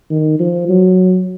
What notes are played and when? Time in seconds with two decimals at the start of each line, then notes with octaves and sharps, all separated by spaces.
0.10 D#3
0.40 F3
0.69 F#3